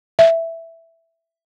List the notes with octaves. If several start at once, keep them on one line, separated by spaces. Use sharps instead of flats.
E5